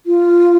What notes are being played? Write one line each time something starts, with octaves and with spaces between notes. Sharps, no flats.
F4